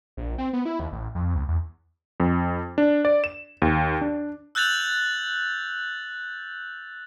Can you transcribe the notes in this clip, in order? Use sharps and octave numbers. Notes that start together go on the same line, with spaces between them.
A#1
C4
B3
E4
D#2
A1
F2
C#2
E2
F2
D4
D5
E7
D#2
D4
E6 F#6 G6 A6 F7 F#7